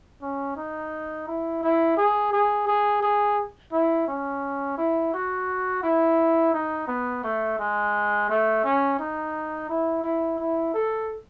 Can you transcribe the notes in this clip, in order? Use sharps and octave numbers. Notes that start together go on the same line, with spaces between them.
C#4
D#4
E4
E4
G#4
G#4
G#4
G#4
E4
C#4
E4
F#4
E4
D#4
B3
A3
G#3
A3
C#4
D#4
E4
E4
E4
A4